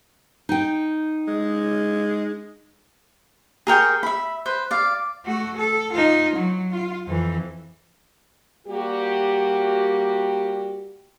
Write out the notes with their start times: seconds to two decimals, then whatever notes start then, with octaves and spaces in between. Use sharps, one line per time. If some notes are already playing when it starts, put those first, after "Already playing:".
0.49 D#4 G5
1.28 G#3
3.67 G#4 A#4 G5 C#6
4.03 E5 B5
4.46 B4 C5
4.71 D5 F5
5.25 A3 F#4
5.57 A4
5.93 D#4 F4
6.36 F#3
6.71 F4
7.07 F2 E3
8.67 G3 A#3 F#4 G4